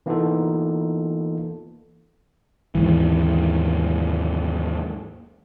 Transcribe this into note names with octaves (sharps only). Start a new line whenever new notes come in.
E3 A#3 B3 D#4 F4 A4
D#2 G#2 E3